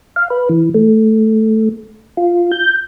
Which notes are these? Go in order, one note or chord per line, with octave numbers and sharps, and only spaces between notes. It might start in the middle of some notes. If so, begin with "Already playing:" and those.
F5
B4
E3
A3
F4
G6